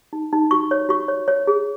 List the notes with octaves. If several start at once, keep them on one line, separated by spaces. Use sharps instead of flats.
D#4
D#4
F#4 C#6
C#5
F#4 C#6
C#5
C#5
G#4